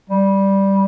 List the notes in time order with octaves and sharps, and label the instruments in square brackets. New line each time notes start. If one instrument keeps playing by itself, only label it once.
[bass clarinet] G3